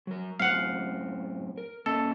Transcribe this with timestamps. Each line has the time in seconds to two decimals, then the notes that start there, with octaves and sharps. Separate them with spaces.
0.07 F#3 A#4
0.40 F#2 A2 C4 F5 F#5
1.58 A#4
1.86 A#3 C#4 A4 D#5